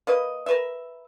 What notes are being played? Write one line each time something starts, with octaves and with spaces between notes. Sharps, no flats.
A#3 B4 D#5
A#4 B4 E5